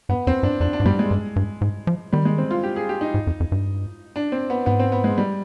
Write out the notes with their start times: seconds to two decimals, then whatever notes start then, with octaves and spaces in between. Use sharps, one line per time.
0.09 G2 B3
0.27 F2 C4
0.43 G2 D4
0.60 F2 D4
0.73 D4
0.80 G#2
0.85 G2 G3
0.99 G#3
1.11 G2
1.36 G2
1.61 G#2
1.87 F3
2.13 D#3 G3
2.25 G#3
2.38 C4
2.51 F4
2.64 G4
2.76 G#4
2.89 G4
3.01 D#4
3.14 G#2
3.27 F2
3.40 F2
3.52 G2
4.16 D4
4.32 C4
4.50 B3
4.66 G#2 B3
4.80 C4
4.92 B3
5.04 G#3
5.18 G3